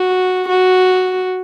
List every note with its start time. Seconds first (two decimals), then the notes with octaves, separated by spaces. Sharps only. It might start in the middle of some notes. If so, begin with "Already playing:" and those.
Already playing: F#4
0.49 F#4